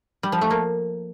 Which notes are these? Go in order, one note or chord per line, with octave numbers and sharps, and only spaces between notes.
G3
F3
A3
A#3